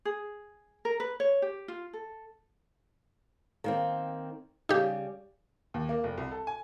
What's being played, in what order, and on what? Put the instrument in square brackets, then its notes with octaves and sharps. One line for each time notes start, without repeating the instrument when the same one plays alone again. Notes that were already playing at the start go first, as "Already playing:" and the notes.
[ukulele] G#4
A#4
B4
C#5
G4
F4
A4
[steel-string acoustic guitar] D#3 A#3 C4
[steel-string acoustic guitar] C#3 G3 [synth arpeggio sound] D#4 G4
[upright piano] D#2
A#3
F1
C2
A4
G#5